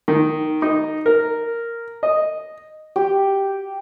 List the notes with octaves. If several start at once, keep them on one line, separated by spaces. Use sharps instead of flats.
D#3
D#4
A#4
D#5
G4